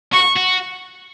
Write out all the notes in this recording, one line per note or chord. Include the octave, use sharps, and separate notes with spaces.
F#4 C#6
F#4